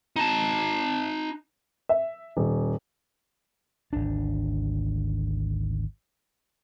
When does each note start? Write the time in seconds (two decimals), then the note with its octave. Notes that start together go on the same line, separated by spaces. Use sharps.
0.16 D#4 A5
1.89 E5
2.37 D#1
3.93 G#1 D2 D4